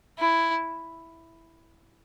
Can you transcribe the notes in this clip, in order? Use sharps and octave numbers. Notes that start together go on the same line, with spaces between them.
E4